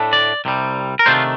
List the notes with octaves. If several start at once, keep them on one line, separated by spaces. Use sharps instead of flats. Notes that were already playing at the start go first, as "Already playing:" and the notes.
Already playing: A2 A3 D4
D5
C2 C3 G3
A#4
C3 D#3 A3 D4 F4 C5